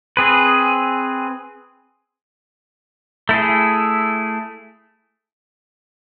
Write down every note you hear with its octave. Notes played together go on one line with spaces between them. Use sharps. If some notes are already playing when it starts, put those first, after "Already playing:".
C4 G#4 B4
A3 E4 G#4